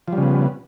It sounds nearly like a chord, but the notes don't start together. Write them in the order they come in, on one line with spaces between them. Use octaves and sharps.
F3 G3 C#3 B3